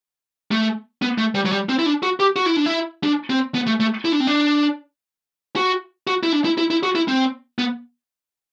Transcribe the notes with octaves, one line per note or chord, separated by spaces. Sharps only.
A3
B3
A3
G3
F#3
G3
C4
E4
D4
F#4
G4
F#4
E4
D4
E4
D4
C4
B3
A3
A3
E4
D4
C4
D4
F#4
F#4
E4
D4
E4
E4
E4
F#4
E4
C4
B3